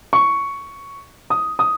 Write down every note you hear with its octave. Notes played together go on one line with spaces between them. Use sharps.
C#6
D#6
D#6